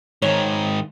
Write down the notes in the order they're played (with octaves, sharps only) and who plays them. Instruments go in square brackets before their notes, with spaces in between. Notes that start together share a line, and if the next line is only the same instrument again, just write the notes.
[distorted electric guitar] G#2 D#3 [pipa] C#5